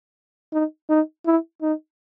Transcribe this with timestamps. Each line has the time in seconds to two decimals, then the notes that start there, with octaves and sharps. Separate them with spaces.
0.53 D#4
0.90 D#4
1.26 E4
1.62 D#4